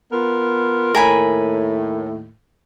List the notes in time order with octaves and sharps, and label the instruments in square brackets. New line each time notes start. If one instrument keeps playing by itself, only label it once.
[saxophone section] B3 F4 A#4
[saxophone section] D#2 A2 [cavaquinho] A#4 G#5 B5